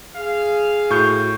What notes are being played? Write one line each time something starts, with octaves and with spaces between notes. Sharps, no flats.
G#4 F5
A2 F#4 C#6 G6